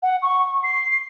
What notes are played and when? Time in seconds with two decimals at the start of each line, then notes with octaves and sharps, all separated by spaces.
0.02 F#5
0.22 C#6
0.63 C7